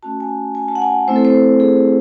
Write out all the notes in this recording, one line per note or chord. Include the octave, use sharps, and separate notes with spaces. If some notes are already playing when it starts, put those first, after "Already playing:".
A3 C#4 F#4 A5
G#5
G#5
A5
F#5
G#5
A3 C4 E4 C5
A4
C5
G#4
C5